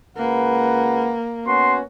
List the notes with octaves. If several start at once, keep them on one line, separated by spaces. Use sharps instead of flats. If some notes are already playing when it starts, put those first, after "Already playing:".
C#2 A#3 B4 F#5
B3 C#4 F#4 C6